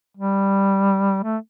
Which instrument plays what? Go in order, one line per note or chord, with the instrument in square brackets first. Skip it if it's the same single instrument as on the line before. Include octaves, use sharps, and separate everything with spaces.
[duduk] G3
A3